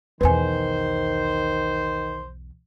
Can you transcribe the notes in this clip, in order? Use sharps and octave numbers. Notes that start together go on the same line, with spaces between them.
B1 E2 D#3 B4 C5 G#5